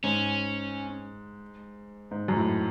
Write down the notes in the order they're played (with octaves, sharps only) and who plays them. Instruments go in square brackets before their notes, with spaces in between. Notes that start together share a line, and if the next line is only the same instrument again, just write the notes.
[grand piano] G#2 [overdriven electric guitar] C#4
[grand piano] G#2
F#2
A2